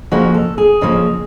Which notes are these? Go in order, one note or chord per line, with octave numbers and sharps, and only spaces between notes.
F2 C#3 F3 A#3 F#4
A4
G#4
F2 C#3 F3 A#3